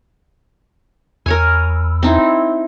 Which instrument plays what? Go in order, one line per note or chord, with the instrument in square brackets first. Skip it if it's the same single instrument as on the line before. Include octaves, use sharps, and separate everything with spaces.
[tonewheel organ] E2 [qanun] A#4 C#5 G#5
[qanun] C4 D#4 E4